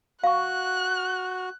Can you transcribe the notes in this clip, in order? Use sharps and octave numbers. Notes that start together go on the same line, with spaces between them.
F#4 F5 C#6 F#6